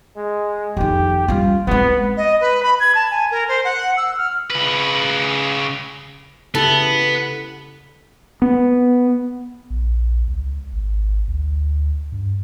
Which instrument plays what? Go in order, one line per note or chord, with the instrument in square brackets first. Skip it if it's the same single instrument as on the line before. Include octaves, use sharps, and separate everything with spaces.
[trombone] G#3
[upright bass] F2 D#3 [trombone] G4
[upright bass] G3 C#4 [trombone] F4
[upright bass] G#3 C4 [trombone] B3
[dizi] D#5
B4
B5
G#6
A5
G#5
A#4
C5
F#5
E6
F6
[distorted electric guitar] C#3 B4
[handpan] C#3 E4 G4 [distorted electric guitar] B3 [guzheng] A4
[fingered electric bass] B3
[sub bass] A#1
C#2
G#1
D2
G2